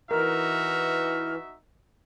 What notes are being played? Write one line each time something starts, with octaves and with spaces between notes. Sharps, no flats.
E3 D#4 F#4 A#4 E5 F6